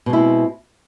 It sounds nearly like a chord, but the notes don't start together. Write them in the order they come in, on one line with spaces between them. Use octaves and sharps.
B2 G#3 E4 C4